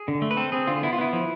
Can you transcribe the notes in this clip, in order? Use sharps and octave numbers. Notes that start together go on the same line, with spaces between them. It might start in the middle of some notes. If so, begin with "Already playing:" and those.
Already playing: G#4
D3
A3
B4
C4 A4
C4 G#4
D3 F4
B3 E4
F4
B3 E4
F3